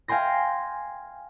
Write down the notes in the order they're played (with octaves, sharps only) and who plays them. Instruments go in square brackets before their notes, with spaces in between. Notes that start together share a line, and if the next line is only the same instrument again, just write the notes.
[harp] F5 G5 G#5 C6 A#6